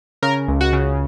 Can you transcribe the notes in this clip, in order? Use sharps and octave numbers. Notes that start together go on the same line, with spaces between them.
C#3 A#4
C#2
F#4
C#3